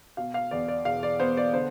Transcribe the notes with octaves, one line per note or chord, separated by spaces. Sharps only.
B2 F5
F5
E2 D5
D5
E1 F5
D5
B3 C5
D5
D3 C5